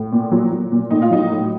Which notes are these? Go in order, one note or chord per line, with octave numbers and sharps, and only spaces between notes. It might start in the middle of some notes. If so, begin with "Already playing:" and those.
Already playing: A2
A#2
F#3
F#3
A#2
A2 D#4
F4
F#3 D#4
A2